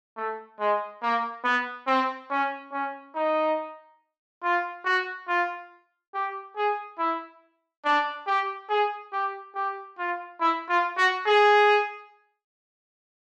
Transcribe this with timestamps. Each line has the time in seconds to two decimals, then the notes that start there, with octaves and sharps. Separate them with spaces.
0.17 A3
0.60 G#3
1.02 A#3
1.44 B3
1.87 C4
2.30 C#4
2.72 C#4
3.15 D#4
4.43 F4
4.85 F#4
5.28 F4
6.14 G4
6.57 G#4
6.99 E4
7.85 D4
8.27 G4
8.69 G#4
9.12 G4
9.55 G4
9.98 F4
10.40 E4
10.69 F4
10.97 F#4
11.26 G#4